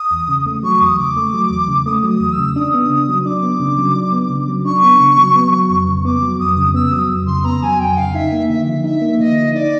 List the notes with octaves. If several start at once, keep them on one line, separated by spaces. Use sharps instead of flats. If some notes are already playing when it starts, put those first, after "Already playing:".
Already playing: D#6
E2
C#3
A3
F#3 C#6
E2 D#6
C#3 D6
A3
F#3
E2
C#3
A3 D#6
F#3
D#6
E2
E6
C#3
D4 D#6
B3
C#3
F#3
D4 D6
B3
C#3
F#3
D4
B3
C#3
F#3
D4 C#6
B3
C#3
F#3
B3
F#3
F2
C#3
B3 D6
F#3
F2 D#6
C#3
B3 E6
F#3 D#6
F2
C#3 C6
B3 A#5
F#3 G#5
F2 G5
C#3 F5
D#4 E5
A#3
D3 E5
F3
D#4 E5
A#3
D3 D#5
F3
D#4 D5